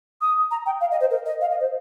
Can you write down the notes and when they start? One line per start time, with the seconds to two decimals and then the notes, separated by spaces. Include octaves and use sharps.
0.21 D#6
0.51 A#5
0.66 G5
0.81 F5
0.91 D#5
1.01 C5
1.11 A#4
1.26 D#5
1.41 F5
1.51 D#5
1.60 C5